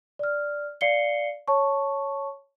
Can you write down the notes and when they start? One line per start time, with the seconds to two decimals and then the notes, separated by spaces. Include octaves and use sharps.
0.19 D5 F6
0.81 D5 F5 C7 C#7 G7
1.48 C#5 A5 C#6